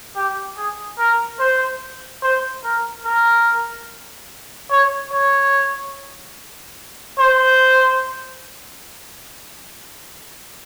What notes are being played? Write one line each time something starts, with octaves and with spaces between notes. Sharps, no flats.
G4
G#4
A#4
C5
C5
A#4
A#4
C#5
C#5
C5